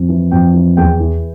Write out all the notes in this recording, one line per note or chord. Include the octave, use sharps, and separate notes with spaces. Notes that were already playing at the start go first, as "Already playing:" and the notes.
Already playing: F2
E3
F2 G5
E3
E2 G5
E3